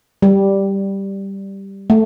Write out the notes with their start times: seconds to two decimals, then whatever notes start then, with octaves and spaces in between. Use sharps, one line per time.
0.22 G3
1.90 A3